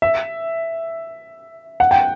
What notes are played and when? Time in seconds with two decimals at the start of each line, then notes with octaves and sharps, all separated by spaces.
0.02 E5
1.80 F#5
1.91 G5